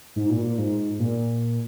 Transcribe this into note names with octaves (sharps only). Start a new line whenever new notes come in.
G#2
A#2
A#2
G#2
A#2